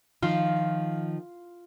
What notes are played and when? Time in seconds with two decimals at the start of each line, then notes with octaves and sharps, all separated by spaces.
0.22 D#3 F3 F4